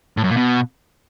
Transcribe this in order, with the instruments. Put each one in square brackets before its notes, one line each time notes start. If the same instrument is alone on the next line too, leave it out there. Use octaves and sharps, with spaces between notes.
[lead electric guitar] A2
F#2
A#2
B2